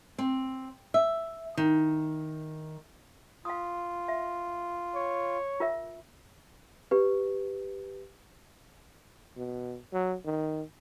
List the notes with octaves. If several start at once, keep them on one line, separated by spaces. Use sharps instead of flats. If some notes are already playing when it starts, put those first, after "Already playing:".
C4
E5
D#3
F4 F5 D#6
E5
C#5
F4 A#4 E5
G4 B4
B2
F#3
D#3